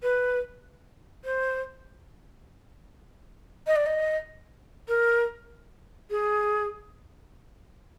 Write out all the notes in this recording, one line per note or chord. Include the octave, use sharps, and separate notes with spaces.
B4
C5
D#5
D5
D#5
A#4
G#4